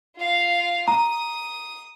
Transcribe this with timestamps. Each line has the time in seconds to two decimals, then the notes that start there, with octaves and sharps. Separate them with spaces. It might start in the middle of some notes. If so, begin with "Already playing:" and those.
0.16 F4 F5
0.88 A#5 D#6